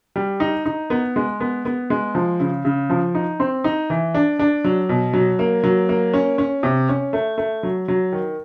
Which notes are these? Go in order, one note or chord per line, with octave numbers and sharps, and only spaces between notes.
G3
D#4
D#4
B3
G#3
B3
B3
G#3
F3
C#3
C#3
F3
D#4
C4
D#4
E3
D4
D4
F#3
B2
F#3
A#3
F#3
A#3
C#4
C#4
C3
C#4
A3
A3
F#3
F#3
D#3